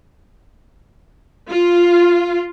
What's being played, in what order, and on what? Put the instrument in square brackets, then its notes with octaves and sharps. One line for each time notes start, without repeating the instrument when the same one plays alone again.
[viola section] F4